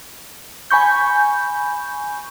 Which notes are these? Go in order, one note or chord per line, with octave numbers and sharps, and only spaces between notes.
G#5 B5 C#6 G6